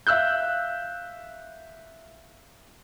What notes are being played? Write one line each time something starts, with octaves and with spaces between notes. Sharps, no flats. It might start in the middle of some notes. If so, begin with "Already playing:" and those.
E5 F5 E6 F#6 G6